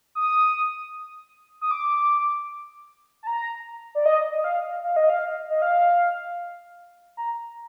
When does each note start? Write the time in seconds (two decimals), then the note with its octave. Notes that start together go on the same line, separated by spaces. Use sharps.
0.15 D#6
1.61 D#6
1.71 D6
3.23 A5
3.27 A#5
3.95 D5
4.06 D#5
4.37 D#5
4.44 F5
4.83 F5
4.96 D#5
5.09 F5
5.50 D#5
5.62 F5
7.17 A#5